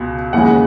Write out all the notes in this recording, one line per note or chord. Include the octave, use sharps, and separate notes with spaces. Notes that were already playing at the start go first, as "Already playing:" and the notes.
Already playing: C#2 B2
D#2 C#3 E3 G#3 F#5